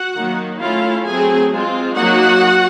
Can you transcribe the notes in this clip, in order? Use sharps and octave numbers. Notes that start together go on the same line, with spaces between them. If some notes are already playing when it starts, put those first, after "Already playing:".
Already playing: F#4 F#5
D#3 F#3 A#3 D#4
A3 C#4 E4 F4 F5
F#3 A3 C4 G#4 G#5
G#3 C4 F4
F#3 A#3 D#4 F#4 F#5